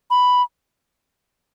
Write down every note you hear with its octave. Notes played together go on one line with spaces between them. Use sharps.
B5